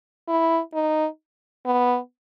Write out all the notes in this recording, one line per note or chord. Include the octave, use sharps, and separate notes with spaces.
E4
D#4
B3